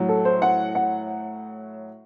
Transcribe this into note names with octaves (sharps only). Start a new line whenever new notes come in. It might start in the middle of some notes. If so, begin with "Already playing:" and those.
Already playing: A2 F#3
A4
C5
F#5
F#5